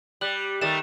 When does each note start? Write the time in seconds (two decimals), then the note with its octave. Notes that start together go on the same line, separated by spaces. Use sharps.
0.21 G3 F#6 F#7
0.61 D#3 G3 A3 A6 E7